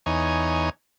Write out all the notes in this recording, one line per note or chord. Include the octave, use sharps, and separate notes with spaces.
E2 D#4 C#5 G#5